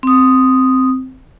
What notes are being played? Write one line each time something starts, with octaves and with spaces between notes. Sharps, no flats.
C4 D#6